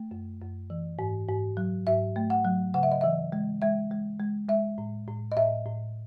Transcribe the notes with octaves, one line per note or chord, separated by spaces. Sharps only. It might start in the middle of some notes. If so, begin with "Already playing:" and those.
Already playing: A3
F#2
F#2
E3
G#2
G#2
F#3
G#2 E5
A3
F#5
F#3
C#3 F#5
E5
D#5
E3 E5
G#3
G#3 E5
G#3
G#3
G#3 E5
A2
A2
D#5
A2 E5
A2